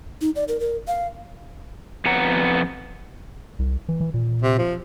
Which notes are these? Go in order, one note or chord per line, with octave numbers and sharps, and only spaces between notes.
D#4
D5
A#4
A#4
F5
F2 B3 F#5 A#5
C2
E3
E3
A#2
C3
F3